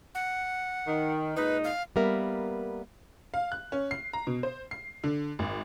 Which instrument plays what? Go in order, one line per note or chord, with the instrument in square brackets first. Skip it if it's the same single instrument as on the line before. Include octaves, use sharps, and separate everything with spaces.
[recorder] F#5
[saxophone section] D#3
[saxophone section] A#2 G#3 D#4 [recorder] B4
[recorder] F5
[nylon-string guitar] G3 A#3 B3 A#4 E5
[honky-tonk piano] F5
F#6
C#4
C7
A#5
B2
C5
C7
D3
G#1